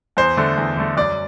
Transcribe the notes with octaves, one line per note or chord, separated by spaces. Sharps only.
E2 C5
D3 A3
E2
D3 A3
F#2 D5